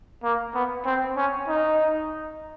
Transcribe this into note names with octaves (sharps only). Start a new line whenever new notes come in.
A#3
B3
C4
C#4
D#4